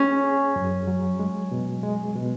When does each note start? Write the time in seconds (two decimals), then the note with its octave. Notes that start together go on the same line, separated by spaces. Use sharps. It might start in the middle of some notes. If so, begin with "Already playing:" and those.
Already playing: C#4 G#4
0.24 G#4
0.56 F#2
0.87 F#3
1.20 G#3
1.51 B2
1.83 G#3
2.15 B2